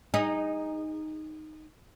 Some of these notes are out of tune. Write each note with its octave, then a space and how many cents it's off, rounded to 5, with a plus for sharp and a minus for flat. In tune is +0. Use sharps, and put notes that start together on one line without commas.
D#4 +0 G#4 -25